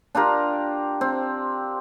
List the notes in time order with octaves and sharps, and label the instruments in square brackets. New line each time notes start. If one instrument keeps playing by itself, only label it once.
[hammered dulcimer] D4 F4 G4 A#4
C4